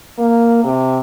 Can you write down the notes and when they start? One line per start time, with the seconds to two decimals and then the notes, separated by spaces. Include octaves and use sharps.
0.18 A#3
0.64 C3